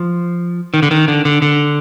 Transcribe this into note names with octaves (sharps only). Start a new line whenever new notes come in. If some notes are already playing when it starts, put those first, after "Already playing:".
Already playing: F3
D#3
D3
D#3
D3
D3
D3